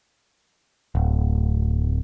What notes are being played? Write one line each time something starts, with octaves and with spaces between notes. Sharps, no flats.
D1